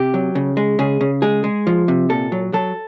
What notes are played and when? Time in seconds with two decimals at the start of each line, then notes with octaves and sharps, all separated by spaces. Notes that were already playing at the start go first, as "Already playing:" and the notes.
Already playing: C3 G4
0.14 F#3
0.35 C#3
0.57 G#3
0.79 C#3 G#4
1.01 C#3
1.22 G#3 G#4
1.44 G#3
1.67 F3
1.88 C3
2.10 A#2 A4
2.32 F#3
2.53 F#3 A4